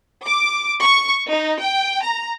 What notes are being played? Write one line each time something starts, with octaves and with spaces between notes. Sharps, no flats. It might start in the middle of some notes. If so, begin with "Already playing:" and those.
D6
C#6
D#4
G5
A#5